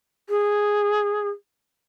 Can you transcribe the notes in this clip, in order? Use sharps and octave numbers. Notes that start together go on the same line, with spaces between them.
G#4